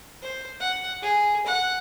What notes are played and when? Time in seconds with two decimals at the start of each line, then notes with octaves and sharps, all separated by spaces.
0.22 C5
0.60 F#5
1.02 G#4
1.46 F#5